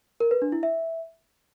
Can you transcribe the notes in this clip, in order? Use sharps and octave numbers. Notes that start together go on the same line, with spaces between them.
A#4
B4
D4
E4
E5